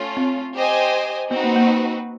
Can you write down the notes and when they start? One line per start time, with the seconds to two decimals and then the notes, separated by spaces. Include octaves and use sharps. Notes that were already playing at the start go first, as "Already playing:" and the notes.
Already playing: A3 C#4 F4
0.17 C4
0.55 G4 C5 D#5 G#5
1.31 B3 C4 D#4 F#4 B4
1.44 A#3
1.56 A#3